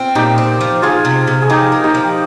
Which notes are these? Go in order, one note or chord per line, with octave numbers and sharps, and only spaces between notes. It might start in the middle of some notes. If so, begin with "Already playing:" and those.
Already playing: C4 F4
A#2 D#4 G4
C4
F3
F3 F4 G#4
C3
C3
G#4
F3 D#4 G4
A#3
D#4 G4
F3